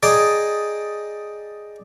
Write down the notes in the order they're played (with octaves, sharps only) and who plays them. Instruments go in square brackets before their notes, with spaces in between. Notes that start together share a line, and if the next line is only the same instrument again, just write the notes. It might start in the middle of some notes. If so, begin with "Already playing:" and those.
[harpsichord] G#4 D5 D#5 G5 A5 A#5